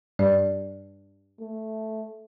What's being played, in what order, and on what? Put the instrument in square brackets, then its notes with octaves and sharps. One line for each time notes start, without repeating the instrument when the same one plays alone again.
[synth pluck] G2 [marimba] D5
[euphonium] A3